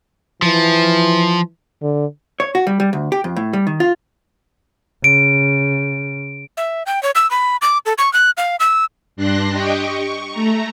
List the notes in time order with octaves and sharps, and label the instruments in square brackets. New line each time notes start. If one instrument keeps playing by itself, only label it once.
[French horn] E3 [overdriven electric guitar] F3
[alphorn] D3
[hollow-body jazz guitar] C#5
F#4
G3
G3
D2
G4
F2
A2
G3
D#3
F4
[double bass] C#3 [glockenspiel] D7
[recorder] E5
G5
C#5
E6
B5
D6
A4
C#6
F#6
F5
E6
[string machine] G2 D4 C6 F#6 A#6
G4 D#5 G5 C#6
C#6
A3 A#5